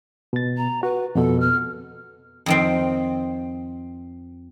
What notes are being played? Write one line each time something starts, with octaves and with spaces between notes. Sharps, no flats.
B2 A6
A#5
F#4 B4
F2 B2 A4
F6
F2 D#3 C4